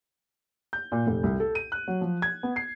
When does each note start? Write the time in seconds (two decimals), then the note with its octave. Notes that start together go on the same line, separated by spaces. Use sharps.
0.73 G6
0.92 A#2
1.07 F1
1.23 C2
1.40 A4
1.55 D#7
1.72 F#6
1.88 F#3
2.01 F3
2.22 G#6
2.43 B3
2.56 C7